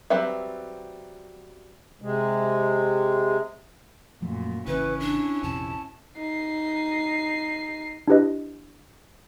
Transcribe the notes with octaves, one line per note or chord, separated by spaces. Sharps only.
F#3 G3 C4 B4 E5
C3 G#3
F#2 A#2 F3 F#3 A3
G#1 C#3 E3 C#4 E4 B4
D4
A#1 F2 C3 A5
D#4 C7
D4 E4 G4 B4 D#5